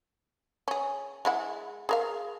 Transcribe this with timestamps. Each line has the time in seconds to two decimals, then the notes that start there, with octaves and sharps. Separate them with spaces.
0.68 C#4 G#4
1.25 G#3 E4 F#5
1.89 G#4 A#4 F5